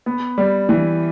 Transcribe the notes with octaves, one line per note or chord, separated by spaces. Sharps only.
B3
G3
E3